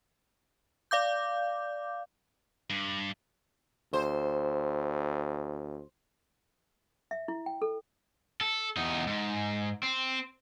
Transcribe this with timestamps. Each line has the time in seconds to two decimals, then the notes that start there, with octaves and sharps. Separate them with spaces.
0.91 D5 F5 D6 G6
2.70 G2
3.93 D2 C5
7.11 E5
7.28 E4
7.46 G5
7.62 A4
8.41 A4
8.76 E2 D#4
9.07 G#2
9.83 C4